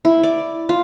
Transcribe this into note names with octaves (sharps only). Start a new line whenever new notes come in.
E4
D5
F4